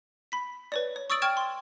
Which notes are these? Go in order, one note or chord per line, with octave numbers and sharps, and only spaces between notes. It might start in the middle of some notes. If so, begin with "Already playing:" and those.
B5 B6
B4 C#5 D5
C#5
C#6 D#6 E6 A6 D7 F#7
G5 C#6 F6 G#6 D7 E7
C6